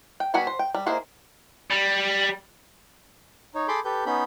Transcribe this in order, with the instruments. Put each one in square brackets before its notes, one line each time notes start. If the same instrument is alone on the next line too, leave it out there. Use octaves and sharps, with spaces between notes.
[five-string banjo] G5
G3 B3 F#4 G#5 B5
C5
G5
G3
A#3 D#4 E4 G#4 C5
[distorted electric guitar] G3
[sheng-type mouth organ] D#4 C#5
G#4 A4 B5 C6 D6 G6
G4 A4 B4 G6
B3 C#4 D#4 B5 G6